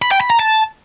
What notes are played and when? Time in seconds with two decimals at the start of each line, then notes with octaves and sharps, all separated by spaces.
0.02 B5
0.11 G5
0.21 B5
0.30 A#5
0.39 A5